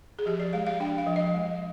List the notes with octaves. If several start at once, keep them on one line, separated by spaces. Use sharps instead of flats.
G#4
F3 G4
D5
G#3 F5
F5
D4 G5
F5
F3
D#5
G#3